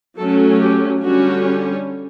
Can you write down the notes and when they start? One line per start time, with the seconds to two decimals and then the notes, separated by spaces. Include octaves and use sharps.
0.17 F#3 A3 C#4 A4
0.60 G4
1.04 D3 G3 C#4 F#4